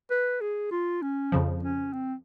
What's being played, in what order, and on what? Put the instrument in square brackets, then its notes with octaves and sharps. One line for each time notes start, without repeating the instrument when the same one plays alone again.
[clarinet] B4
G#4
F4
C#4
[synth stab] F2 C#3 F3
[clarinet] C#4
C4